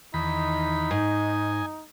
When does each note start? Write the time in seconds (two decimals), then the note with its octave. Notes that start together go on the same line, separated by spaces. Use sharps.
0.14 E2 D#3 D#4 B5
0.91 G#2 D#5 G#5